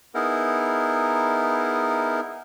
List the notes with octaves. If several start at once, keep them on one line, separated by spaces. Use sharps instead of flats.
B3 D#4 E4 G#4 A#4